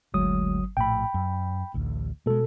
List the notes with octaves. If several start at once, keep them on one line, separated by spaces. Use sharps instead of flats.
G1 D2 F#3 G#3 D#6
A#1 A2 G5 B5
F#2
A1 D2
B2 G#3 A3 A4